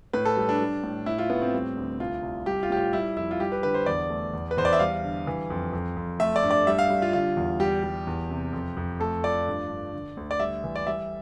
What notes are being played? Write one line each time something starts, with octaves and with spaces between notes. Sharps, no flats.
A2 B4
A4
G3
D4
G3
A2
A2 E4
F4
A2 B3
C4
G3
D2
C2 F4
C2
G3 G4
F4
A2 G4
F4
G3 E4
F2 E4
F4
G3 G4
B4
D3 B4
C5
E2 D5
A3
E2
B4
E2 C5
D5
E5
G3 F5
D3
E3
F2
F2
F2
A3 E5
D5
G2
D5
G3 E5
F5
G3
F4
D3 F4
E2
G3 G4
G3
E2
C3
F2
F2
A3 A4
F3 D5
G2
G2
D3
D2
D5
G3 E5
E3
D5
G3 E5